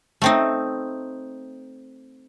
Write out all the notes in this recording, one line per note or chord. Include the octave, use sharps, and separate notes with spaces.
A3 C4 D#4